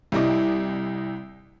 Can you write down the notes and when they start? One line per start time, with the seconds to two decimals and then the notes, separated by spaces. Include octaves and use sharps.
0.12 C2 G3 E4 D#5 D6